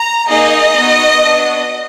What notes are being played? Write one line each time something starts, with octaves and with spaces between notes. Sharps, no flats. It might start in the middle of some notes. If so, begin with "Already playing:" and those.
Already playing: A#5
A#3 D#4 G#4 D#5
B3 D#4 F#4
B3 D4 F#4